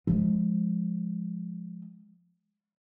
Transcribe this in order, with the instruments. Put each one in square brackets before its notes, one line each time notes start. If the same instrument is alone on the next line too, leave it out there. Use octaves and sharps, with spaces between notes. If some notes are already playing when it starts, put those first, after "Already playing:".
[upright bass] F3 G#3